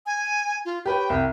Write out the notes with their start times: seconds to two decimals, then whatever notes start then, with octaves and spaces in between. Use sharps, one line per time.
0.06 G#5
0.65 F4
0.86 G4 B4 C#5 G5
1.10 C2